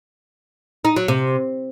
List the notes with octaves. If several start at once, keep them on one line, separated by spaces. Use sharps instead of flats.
D#4
F#3
C3